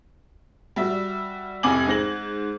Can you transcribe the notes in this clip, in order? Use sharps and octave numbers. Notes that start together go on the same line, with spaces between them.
G3 F#4 E5
F1 C2 G#5 D6 G#6 F#7
G#2 C5 A#6 F#7